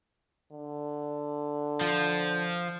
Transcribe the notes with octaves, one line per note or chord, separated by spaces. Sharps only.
D3
F3